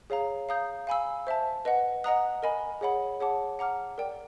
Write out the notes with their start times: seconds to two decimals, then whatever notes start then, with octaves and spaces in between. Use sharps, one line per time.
0.10 G#4 C#5 F5 A#5
0.49 F5 A#5 D#6 G6
0.87 F5 G#5 B5 E6
1.27 C5 E5 A5
1.65 B4 D#5 F#5
2.04 D#5 F#5 A#5 D#6 F#6
2.43 A#4 D#5 G#5 B5
2.81 G#4 C#5 F#5 B5
3.20 G#4 C#5 F#5 A5 D6
3.59 F#5 A#5 D6 F6
3.98 A#4 D5 G5